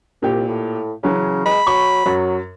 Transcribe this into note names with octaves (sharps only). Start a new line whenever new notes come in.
C2 A#2 G4
A2
C#3 E3 F#3 C#4
G#3 B5
F#3 C#6
F#2 F#3